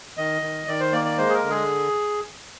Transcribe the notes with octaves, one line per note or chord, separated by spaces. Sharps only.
D#3 D#5
D#3
D#3 D5
C5
A#3 D5
D5
G#3 C5
G#4
A#4
D3
G#4